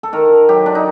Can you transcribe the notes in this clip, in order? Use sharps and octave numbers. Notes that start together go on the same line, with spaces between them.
A4
D#3 A#4
F#3 G4
D4
D#4